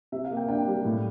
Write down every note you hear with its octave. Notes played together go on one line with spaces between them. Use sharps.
C3 E5
F5
A#3
G5
D4 G5
G3
A2